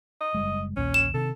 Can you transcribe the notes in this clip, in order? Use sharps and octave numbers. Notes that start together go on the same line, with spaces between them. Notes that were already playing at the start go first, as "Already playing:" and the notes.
D#5
F#1 G3 G#3
A#1 D#2 A#2 C#4
E7
C3 D#3 A4